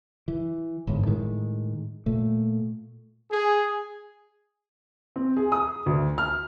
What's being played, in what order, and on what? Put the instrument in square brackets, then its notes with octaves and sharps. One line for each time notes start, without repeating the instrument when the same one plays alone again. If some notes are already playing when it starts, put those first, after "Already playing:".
[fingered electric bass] E3
G1 G#2
A2 D#3 G#3
A#2 A3
[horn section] G#4
[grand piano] C4
G#4
D#6
D2
F6